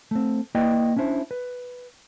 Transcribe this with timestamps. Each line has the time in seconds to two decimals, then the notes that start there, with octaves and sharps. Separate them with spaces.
0.11 A3 C4
0.55 A#3 E4 B4 D5 D#5 G5
0.96 C#4 D4 E4 C5
1.31 B4